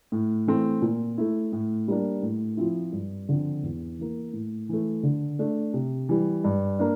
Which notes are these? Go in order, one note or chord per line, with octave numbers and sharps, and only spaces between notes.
A2
E3 A3 C4
A#2
A3 E4
A2
G3 A#3 D4
A2
F3 C4 E4
G2
D3 F3 C4
E2
E3 A#3
A2
E3 A3
D3
A3 D4
C3
E3 G3
G2
A#3 D4